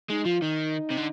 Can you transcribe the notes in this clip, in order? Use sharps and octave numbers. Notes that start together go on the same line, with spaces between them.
G#3 D#4
F3 F4
D#3 D#4
C3
D3